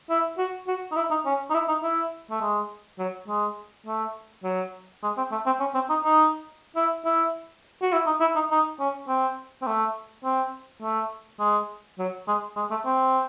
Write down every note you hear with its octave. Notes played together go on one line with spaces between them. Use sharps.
E4
F#4
F#4
D#4
E4
D#4
C#4
D#4
E4
D#4
E4
A3
G#3
F#3
G#3
A3
F#3
G#3
C4
A3
C4
C#4
C4
D#4
D#4
E4
E4
F#4
E4
D#4
E4
D#4
D#4
C#4
C4
C4
A3
C4
A3
G#3
F#3
G#3
G#3
A3
C4